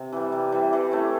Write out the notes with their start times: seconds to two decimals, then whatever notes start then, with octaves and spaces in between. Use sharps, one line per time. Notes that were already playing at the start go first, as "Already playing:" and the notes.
Already playing: C3
0.12 E3 G3
0.32 C3
0.52 E3 G3
0.73 E3
0.92 A3 C#4